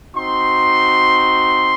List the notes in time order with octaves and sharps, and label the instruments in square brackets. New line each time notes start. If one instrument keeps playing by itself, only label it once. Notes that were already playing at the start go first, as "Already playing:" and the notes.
[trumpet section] C4 D#4 F#4 C6